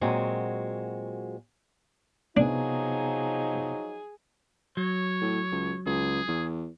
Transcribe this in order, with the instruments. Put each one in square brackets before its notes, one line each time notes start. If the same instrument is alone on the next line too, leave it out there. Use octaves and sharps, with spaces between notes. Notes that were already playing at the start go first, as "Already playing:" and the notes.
[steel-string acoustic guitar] A#2 F#3 G#3 C4 F#4 G#5
[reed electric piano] C3 B3 [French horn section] F3 F#3 D#4 [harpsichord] D4 [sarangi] G#4
[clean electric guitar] F#3 [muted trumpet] C#5
[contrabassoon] A2
C#2
[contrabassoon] C#2 [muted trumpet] G#4
[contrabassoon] E2